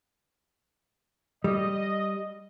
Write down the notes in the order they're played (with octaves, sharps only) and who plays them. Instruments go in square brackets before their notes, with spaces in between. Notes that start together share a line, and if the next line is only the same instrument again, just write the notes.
[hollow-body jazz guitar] G3 [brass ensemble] D#5